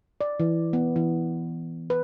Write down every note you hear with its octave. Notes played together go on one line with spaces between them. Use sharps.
D5
E3
B3
E3
B4